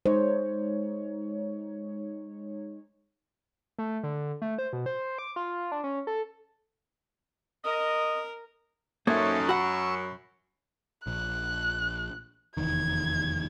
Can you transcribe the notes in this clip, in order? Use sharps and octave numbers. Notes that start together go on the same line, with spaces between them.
G#3 D#4 C5 C#5
A3
D3
A3
C5
B2
C5
D6
F4
D4
C#4
A4
A#4 D#5
F#2 A#3 C#4 D#4 A4 C5 E5 G#6
F#4 F#5 B5 C#6 E6
A#1 F#6
F1 E2 D#3 G#6